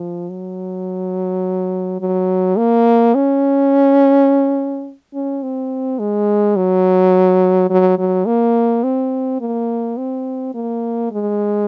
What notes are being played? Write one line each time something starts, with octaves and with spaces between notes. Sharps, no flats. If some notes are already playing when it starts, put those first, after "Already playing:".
Already playing: F3
F#3
F#3
A#3
C#4
C#4
C4
G#3
F#3
F#3
F#3
A#3
C4
A#3
C4
A#3
G#3